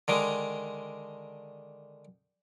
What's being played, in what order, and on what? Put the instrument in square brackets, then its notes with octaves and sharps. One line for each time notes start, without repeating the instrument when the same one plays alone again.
[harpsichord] D3 D#3 G#3